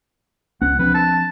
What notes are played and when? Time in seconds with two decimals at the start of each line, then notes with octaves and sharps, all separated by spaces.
0.62 C#2 B3 C#4 F#5
0.79 F3 C4 D4 B4
0.94 A5